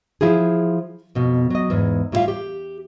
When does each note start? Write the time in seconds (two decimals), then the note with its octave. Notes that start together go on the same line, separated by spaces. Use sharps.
0.21 F3 E4 F4 G#4
1.15 F2 B2
1.50 F#3 D#5
1.70 E2 G#2
2.12 A2 G3 E4 F4 E5 F5
2.28 G4